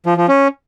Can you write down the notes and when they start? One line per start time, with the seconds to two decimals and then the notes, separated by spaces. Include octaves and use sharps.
0.06 F3
0.17 F3
0.28 C#4